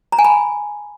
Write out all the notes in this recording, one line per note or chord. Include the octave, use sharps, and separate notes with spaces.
A#5
G#5
B5